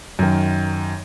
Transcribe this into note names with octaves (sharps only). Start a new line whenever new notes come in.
F#2 D#3